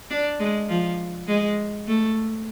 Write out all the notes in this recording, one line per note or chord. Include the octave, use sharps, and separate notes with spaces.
D4
G#3
F3
G#3
A3